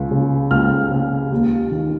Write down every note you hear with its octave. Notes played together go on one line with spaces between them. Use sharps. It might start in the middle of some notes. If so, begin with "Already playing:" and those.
Already playing: C#2
C#3
C#2 F6
C#3
D#2
D#3